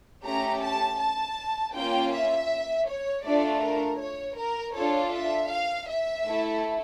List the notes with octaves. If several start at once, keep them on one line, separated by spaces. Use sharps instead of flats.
A3 C#4 G4 A#5
A5
A5
A#3 C#4 F4 G5
E5
C#5
A3 D4 F4 A4 D5
A#4
C#5
A#4
D4 F4 A4 C#5
E5
F5
E5
A3 E4 A4